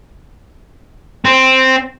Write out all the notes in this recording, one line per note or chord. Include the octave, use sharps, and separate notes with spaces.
C4